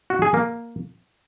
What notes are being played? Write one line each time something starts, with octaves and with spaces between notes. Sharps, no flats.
F#4
G#4
A#3